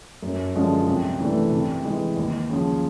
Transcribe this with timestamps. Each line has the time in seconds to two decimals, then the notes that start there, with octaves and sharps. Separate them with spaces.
0.22 F#2
0.55 D3 F3 G#3 C#4
0.88 C3
1.20 E3 A3 D4
1.52 C3
1.85 E3 G#3
2.17 D#2
2.50 C#3 F3